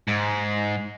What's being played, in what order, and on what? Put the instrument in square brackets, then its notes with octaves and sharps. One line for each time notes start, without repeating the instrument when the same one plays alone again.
[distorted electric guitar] G#2